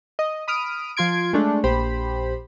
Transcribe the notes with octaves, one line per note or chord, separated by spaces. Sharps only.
D#5
B5 D#6 F6 D7
F3 F4 C6 G#6 D7
G#3 A3 D4 A4
A#1 G4 C5 B5